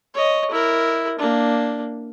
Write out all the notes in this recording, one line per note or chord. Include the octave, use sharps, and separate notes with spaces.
C#5 D#5
E4 A#4
A#3 D4